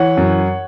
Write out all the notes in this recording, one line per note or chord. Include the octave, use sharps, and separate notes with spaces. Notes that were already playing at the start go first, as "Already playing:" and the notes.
Already playing: E3 C#5 F#5
F#2